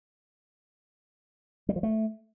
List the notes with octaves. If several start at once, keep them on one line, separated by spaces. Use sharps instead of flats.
G3
F3
A3